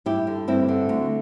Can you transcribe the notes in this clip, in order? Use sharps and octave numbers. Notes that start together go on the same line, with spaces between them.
G2 E4 G4
D3
G2 C4 E4
D3
D2